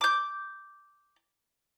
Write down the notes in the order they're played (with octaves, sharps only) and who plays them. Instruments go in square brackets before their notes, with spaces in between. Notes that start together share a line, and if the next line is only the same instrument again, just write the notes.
[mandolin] D6 G6